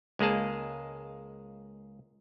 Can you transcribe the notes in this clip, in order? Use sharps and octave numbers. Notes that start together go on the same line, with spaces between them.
C#2 G#3 A#3 G#4 A5